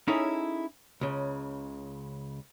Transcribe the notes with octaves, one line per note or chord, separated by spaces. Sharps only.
C#4 D#4 E4 G#4 A4 C#5
C#2 C#3